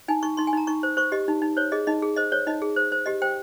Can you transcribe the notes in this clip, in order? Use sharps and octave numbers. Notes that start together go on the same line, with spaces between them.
D#4 G#5
D#4 C#6
D#4 C6
G#5
D#4 A#5
D#4 C#6
C5
C5 C#6
G4 D#5
D#4
D#4
C5 C#5
G#4 D#5
D#4 D#5
G#4
C5 D#5
C5 C#5
D#4 D#5
G#4
C5
C5
G4 D#5
C5 G5